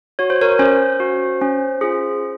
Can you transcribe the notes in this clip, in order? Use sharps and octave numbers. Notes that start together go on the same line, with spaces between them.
F#4 C#5
C5
A#4 C#5
C#4 C5
F#4
C#4
F4 G#4